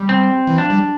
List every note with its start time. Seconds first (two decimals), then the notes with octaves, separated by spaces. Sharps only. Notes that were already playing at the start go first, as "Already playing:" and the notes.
Already playing: G3
0.09 C4
0.47 E3
0.58 F3 D4
0.70 G3